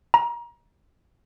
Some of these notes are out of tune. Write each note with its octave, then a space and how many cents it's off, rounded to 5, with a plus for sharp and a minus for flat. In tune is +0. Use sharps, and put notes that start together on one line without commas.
A#5 +30